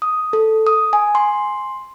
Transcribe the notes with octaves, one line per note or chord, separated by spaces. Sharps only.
D#6
A4
D#6
G#5
C6